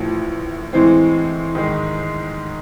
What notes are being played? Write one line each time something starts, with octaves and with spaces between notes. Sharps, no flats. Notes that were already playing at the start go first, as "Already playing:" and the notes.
Already playing: A1 A2 F3
A2 E3 G#3 C4
G#2 D#3 G#3